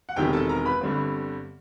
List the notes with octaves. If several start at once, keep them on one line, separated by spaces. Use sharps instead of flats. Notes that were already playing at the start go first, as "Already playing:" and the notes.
F#5
E1 E2 C3 D#3 G4 G5
A4 A5
A#4 A#5
B4 B5
G1 G2 D3 G3 C4